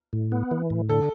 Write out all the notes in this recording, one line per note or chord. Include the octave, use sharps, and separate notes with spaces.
A2
B3
E3
A2
D3 A4